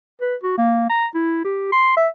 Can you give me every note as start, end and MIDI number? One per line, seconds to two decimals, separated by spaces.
0.22 0.36 71
0.43 0.53 66
0.58 0.88 58
0.90 1.06 82
1.15 1.42 64
1.44 1.69 67
1.72 1.95 84
1.97 2.08 76